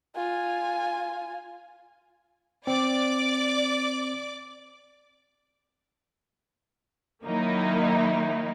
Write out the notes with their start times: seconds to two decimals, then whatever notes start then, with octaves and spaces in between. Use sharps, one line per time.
0.16 F4 G#5
2.67 C4 D5 D6
7.23 D#3 F#3 A#3 D#4 E4